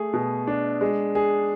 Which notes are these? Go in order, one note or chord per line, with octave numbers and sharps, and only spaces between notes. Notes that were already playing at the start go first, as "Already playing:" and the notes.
Already playing: A3 G#4
B2
D4
G#3
G#4